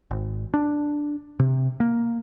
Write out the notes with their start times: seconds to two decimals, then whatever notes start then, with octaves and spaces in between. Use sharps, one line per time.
0.11 G#1
0.54 D4
1.39 C3
1.80 A#3